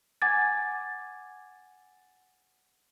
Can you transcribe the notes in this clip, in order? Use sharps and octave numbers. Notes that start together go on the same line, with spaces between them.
F#5 G#5 D6 G#6 A6